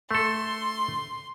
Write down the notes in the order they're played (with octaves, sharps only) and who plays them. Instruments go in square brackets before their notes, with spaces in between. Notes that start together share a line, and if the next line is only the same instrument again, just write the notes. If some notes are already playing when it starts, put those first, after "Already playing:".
[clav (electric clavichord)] A3 A4 [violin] C6